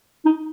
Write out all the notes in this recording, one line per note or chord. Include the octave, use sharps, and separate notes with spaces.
D#4